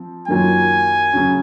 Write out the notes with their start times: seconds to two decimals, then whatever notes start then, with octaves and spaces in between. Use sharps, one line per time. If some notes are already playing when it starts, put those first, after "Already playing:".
Already playing: F3 C4
0.28 F#2 D#3 F#3 A#3 F4 G#5
1.13 C#3 F#3 C#4